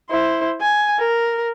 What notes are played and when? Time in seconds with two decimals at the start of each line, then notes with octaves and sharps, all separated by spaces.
0.10 E4 C5
0.61 G#5
0.99 A#4